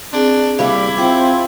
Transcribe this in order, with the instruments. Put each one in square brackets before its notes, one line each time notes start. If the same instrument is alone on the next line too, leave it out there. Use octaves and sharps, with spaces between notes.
[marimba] C4 G#4 [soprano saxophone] D4
[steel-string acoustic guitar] D#2 G3 G4 [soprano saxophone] E4 [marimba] F5
[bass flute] C4 [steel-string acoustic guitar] F4 [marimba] G5 D6